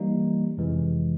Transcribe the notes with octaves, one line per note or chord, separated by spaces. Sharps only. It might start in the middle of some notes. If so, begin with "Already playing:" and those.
Already playing: E3 G3 A#3 D#4
F2 C3 E3 G#3